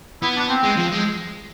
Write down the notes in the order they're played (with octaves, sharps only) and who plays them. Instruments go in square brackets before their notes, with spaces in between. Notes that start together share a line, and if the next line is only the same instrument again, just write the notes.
[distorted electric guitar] B3 [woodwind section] E4
[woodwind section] D4
C4
[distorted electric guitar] G#3
F3
G#3